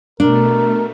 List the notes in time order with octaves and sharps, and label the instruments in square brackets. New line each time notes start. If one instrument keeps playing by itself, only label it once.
[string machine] B2 A3 [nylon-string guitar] D4 [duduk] A#4